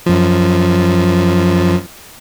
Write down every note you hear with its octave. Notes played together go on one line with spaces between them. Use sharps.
F#2 F3